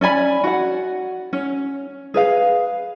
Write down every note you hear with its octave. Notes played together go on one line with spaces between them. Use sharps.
C#4 D5 G#5 B5
F#4 F#5
C#4
G#4 B4 F5